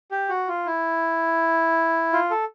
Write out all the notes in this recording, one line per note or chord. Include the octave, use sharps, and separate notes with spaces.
G4
F#4
F4
E4
F4
A4